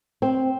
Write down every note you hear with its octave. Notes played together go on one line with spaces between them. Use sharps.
C4